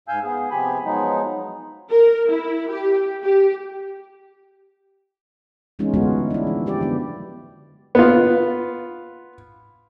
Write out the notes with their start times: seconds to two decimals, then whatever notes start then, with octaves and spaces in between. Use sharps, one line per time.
0.08 G#2 F5 G#5 E6 G6
0.24 B3 G#4
0.51 C3 F3 B3 G4 G#5 B5
0.84 F3 F#3 G#3 B3 D#4
1.91 A#4
2.29 E4
2.70 G4
3.24 G4
5.79 E3 G#3 B3 C#4 D#4 F4
5.94 D3 G#3 A3 B3 F4 F#4
6.30 D4 E4
6.47 F3
6.66 D4 G4 D5
6.81 D3 F#3 B3
7.95 B3 F4